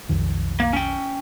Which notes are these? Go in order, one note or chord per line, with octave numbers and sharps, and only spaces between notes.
B1 F2 D#3
A#3
C#4 G5